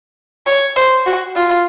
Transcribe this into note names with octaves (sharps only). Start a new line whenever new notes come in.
C#5
C5
F#4
F4